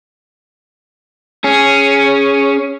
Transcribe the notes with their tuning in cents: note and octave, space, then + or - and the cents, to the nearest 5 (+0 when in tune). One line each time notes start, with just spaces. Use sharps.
C#4 +0 G#4 +0